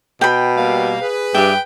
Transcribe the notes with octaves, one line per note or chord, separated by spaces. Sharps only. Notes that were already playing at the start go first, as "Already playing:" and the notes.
B2 G5 B5
G3 A#3 F5
G#4 B4
G2 G4 E5 G5